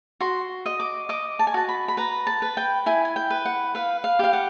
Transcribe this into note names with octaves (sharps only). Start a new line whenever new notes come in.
F#4 C6
D#5
D6
D#5 D6
A5
G#5
F#4 A5
B5
B5
B4 A#5
A5
B4
G5
E4 G#5
G#5
G5
B4
F#5
B4 F5
F5
G4 F5
F#5